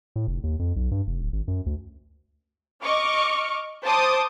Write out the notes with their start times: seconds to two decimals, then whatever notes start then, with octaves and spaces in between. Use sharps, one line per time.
0.16 A2
0.27 F1
0.43 D#2
0.59 F2
0.76 B1
0.91 G2
1.07 F1
1.20 D1
1.32 G#1
1.48 F#2
1.66 D2
2.83 D#5 C#6 D6 F6
3.83 C5 A5 D6 D#6